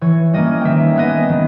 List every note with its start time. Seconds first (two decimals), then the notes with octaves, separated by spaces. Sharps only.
0.01 E3 C#5
0.34 G3 A#3 C#4 D#5
0.61 D#3 E5 G5
0.96 G#3 B3 D#5
1.29 D#3